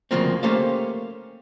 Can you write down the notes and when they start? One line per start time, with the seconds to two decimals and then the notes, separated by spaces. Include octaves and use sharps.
0.11 D2 C#3 F3 A#3 C4
0.43 A3 A#3 C#4 G4 C5 F5